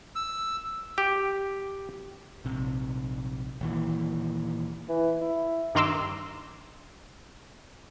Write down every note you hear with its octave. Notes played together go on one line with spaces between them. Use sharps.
E6
G4
A#1 C3
D#1 D#2 E3
E3
E4
G2 D#3 A#5 C6 D6 E6